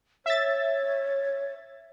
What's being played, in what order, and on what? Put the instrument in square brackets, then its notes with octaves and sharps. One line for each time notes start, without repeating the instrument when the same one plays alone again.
[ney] C#5 [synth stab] E5 A6